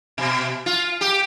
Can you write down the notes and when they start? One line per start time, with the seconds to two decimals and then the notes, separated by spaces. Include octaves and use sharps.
0.18 B2
0.66 F4
1.01 G4